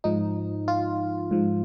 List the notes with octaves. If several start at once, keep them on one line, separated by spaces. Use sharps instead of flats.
G#2 F3 D#4
F4
G#2 F3